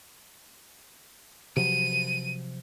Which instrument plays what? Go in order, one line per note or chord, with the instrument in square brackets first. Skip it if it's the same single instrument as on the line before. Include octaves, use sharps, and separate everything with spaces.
[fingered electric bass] C3 F3 F#3 [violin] D#7